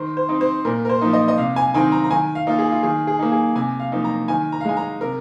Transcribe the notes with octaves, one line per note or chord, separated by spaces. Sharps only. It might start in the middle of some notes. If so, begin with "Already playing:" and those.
Already playing: D#3 C5
C5
C4 D#4
C5
A#2 A#4
A#4
C5
F3 A#3 D#4
D#5
D#5
C3 F5
G#5
D#3 C4 D#4 G#5
A#5
A#5
D#3 G#5
F5
A#3 D#4 F4
G#4
F4
D#3 G#4
G#4
A#3 D#4
G#4
C3 G#5
F5
F3 A#3 D#4
A#5
D#3 G#5
A#5
F5
G#3 D#4 G#5
A#5
C3 A#4